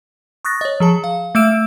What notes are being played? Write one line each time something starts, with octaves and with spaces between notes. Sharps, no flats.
C#6 D#6 F#6 A6 A#6
C#5 D#5
F3 G#4 A5
F5
A3 E5 E6 D7 E7